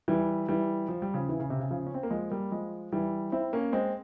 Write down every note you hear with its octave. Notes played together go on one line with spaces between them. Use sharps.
E3 G3
E3 G3
F3
G3
C#3 F3
E3
C#3
C3
C#3
C#3 F3
C#4
C4
A#3
F3 G#3
G3 A#3
F3 G#3
E3 G3
C4 E4
A#3 C#4
G#3 C4